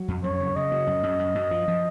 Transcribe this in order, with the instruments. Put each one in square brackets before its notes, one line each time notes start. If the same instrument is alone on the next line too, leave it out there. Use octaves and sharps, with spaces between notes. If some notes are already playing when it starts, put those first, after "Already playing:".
Already playing: [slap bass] F#3
F2
[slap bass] F#2 [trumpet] C#5
[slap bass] C#3
[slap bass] C#3 [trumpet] D#5
[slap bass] F#3
F#2
F#2
F#2
F#2
F3
F3